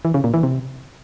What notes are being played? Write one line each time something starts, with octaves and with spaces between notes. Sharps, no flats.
E3
C#3
A#2
E3
C3